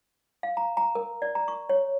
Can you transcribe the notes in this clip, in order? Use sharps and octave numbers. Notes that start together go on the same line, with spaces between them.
F5
A#5
A#5
A#4
D5
A#5
C#6
C#5